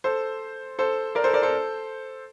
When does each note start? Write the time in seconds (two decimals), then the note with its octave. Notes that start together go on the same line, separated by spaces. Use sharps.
0.04 A4 C5
0.79 A4 C5
1.15 A#4 D5
1.24 A4 C5
1.33 A#4 D5
1.42 A4 C5